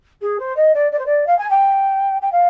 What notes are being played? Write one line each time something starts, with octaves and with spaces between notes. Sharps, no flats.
G#4
C5
D#5
D5
D5
C5
D5
F5
G#5
G5
G5
F5